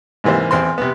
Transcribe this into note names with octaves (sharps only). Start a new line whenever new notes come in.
G#2 C3 E3 A#3 C5
A1 E2 C4 C6
C3 B3